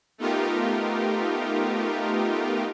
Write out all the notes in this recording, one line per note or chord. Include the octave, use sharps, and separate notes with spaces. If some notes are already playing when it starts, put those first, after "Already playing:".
A3 B3 D#4 F4 G4 A#4